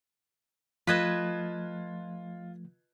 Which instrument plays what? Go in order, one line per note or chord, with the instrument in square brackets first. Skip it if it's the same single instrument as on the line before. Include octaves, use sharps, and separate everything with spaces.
[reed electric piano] F3 A3 [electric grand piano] F4 F#6 G#6 [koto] B4 D#5 A5